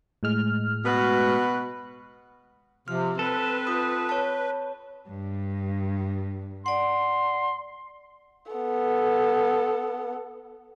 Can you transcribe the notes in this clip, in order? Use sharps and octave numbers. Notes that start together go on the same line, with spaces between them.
A2 G#3 F6
B2 F#4 B4
C3 F3 F6
C4 A4 B4
F4 D#6
C#5 A5
G2
D5 F#5 C6
B3 A4